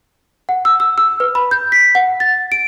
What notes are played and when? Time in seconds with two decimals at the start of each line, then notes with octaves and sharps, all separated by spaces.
0.49 F#5
0.65 E6
0.80 E6
0.98 E6
1.20 B4
1.35 B5
1.51 G6
1.72 B6
1.95 F#5
2.20 A6
2.52 D7